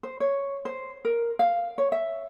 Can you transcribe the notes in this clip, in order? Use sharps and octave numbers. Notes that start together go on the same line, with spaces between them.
C5
C#5
C5
A#4
F5
C#5
E5